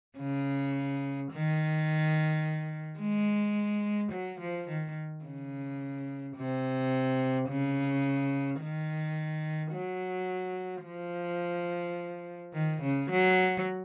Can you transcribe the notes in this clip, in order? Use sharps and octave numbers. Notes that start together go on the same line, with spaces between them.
C#3
D#3
G#3
F#3
F3
D#3
C#3
C3
C#3
D#3
F#3
F3
D#3
C#3
F#3